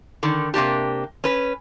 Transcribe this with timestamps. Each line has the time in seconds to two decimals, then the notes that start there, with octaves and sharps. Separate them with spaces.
0.23 D3 D#3
0.54 C3 A#3 D4 G4
1.24 C#4 B4